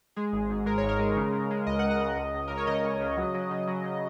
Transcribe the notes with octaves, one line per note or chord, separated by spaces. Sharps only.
G#3 G#4
G#1
G#2
G#3 A#4
G#1 C#5
A#4
G#3
C#3
C#3
G#3
C#2 D#5
C#2 F#5
D#5
C#3
C#2
C#2
C#2 A#4
C#5
C#3 D#5
C#2
C#3
F#3
F#3
C#3
F#3
C#3